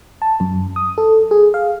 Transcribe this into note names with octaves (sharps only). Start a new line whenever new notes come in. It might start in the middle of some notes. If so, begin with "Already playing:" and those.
A5
F#2
D#6
A4
G#4
F5